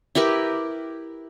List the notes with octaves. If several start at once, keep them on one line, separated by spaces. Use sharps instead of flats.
E4 G4 A#4 B4